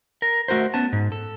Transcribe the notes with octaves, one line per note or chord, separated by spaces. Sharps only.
A#4
A3 F#4 A#4 C5
B3 C#4 A5
G#2
A4